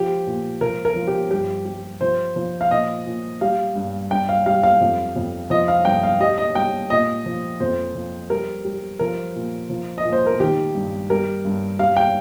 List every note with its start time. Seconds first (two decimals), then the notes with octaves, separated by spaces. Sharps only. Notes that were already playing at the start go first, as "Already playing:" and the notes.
Already playing: F3 G4
0.27 A#2
0.61 F3 A#4
0.85 A#4
0.96 F3
1.07 G4
1.31 G2 G4
1.65 G3
2.01 F3 C5
2.36 F3
2.61 F5
2.71 A#2 D#5
3.06 A#2
3.41 G3 F5
3.75 G2
4.11 G2 G5
4.29 F5
4.46 G3 F5
4.63 F5
4.81 F2
5.16 F2
5.50 F3 D#5
5.68 F5
5.85 G2 G5
6.03 F5
6.20 G3 D#5
6.38 D#5
6.55 G3 G5
6.90 A#2 D#5
7.26 F3
7.60 F2 C5
7.95 F3
8.30 G3 A#4
8.64 G3
8.99 F3 A#4
9.36 A#2
9.70 F3
9.98 D#5
10.05 A#2
10.13 C5
10.26 A#4
10.40 D#3 G4
10.75 G2
11.10 G3 A#4
11.45 G2
11.79 G3 F5
11.96 G5